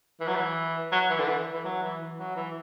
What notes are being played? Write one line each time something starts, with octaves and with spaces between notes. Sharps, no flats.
E3
F#3
E3
F#3
E3
D3
E3
E3
F#3
E3
E3
F#3
E3